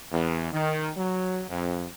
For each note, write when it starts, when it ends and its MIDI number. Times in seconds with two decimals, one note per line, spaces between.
0.12 0.50 40
0.52 0.90 51
0.97 1.43 54
1.49 1.86 41